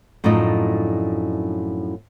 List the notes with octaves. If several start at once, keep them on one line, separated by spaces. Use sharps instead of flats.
F#2 A2 F3 D4 D#4 D#5